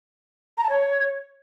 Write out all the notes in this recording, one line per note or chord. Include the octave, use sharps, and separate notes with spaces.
A#5
A5
C#5